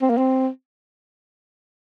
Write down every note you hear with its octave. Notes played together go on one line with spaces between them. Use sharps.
C4
A#3
C4